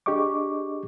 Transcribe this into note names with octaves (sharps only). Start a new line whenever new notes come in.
D4 G4 G#4 D#5 C#6 D6